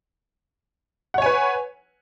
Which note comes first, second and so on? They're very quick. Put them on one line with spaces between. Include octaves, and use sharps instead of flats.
F#5 C#5 G#5 B4